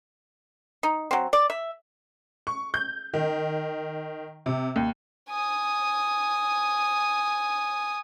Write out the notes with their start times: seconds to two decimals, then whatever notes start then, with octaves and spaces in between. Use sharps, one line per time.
0.83 D#4
1.11 F#3 C4
1.33 D5
1.50 E5
2.47 C#6
2.74 G6
3.14 D#3
4.46 C3
4.76 D#2
5.30 G#5 D#6